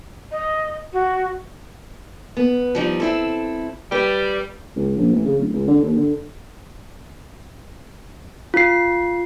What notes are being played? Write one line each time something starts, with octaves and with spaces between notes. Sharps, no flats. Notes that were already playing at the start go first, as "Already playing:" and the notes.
D#5
F#4
B3
F3 G3 D#4
C4 E4 A4
G3 B4
C#2
A#1
A1
C#3
D1
C#2
D3
D#2
D3
F4 C7